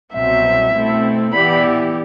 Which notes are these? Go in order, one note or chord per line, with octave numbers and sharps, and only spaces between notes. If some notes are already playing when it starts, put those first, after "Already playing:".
C2 B2 F#3 C4 E5
B2 A3 C4 E4 A4
E3 B3 E4 G4 D5 B5